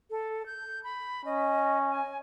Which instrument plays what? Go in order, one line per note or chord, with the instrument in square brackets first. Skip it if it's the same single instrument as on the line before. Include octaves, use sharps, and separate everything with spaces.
[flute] A4
G6
B5
[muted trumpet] C#4 [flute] D#5
[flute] G#5